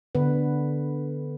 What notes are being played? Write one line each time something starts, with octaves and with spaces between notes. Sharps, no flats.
D3 B3 B4